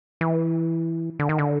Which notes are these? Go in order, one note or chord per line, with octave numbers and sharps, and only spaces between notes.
E3
D3
D#3
D3